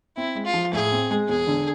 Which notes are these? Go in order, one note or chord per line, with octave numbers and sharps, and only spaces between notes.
C4 E4
G#3
F4
F3
A2 G#4
C4
G#3
E1 G#4
D3